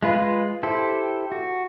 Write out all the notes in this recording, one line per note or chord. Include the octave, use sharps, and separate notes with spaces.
G#3 F4 B4
E4 G4 A4 C5
F#4